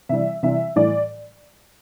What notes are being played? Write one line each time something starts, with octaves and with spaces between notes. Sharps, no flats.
C3 E3 G3 E5
C3 E3 G3 E5
A2 E3 G3 D5